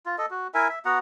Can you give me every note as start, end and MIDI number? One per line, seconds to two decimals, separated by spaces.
0.06 0.16 65
0.18 0.26 69
0.18 0.26 75
0.31 0.47 66
0.54 0.68 64
0.54 0.68 70
0.54 0.68 76
0.54 0.68 80
0.69 0.79 76
0.85 0.99 59
0.85 0.99 66
0.85 0.99 78
0.85 0.99 82